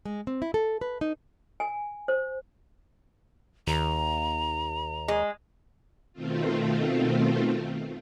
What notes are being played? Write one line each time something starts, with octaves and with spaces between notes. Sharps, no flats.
G#3
C4
E4
A4
B4
D#4
G#5
C5
D#2 A#5
G#3
B2 D#3 A3 C4 F4